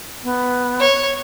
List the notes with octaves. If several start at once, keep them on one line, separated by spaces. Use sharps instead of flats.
B3
C#5